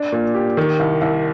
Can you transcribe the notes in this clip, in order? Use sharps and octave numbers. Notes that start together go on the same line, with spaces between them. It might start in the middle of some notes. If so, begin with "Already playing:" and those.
Already playing: D4
A#2
G4
D#3
C2
C2